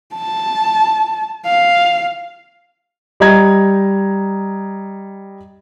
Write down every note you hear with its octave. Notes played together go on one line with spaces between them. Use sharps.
A5
F5
G3 D#5 A#5 G#6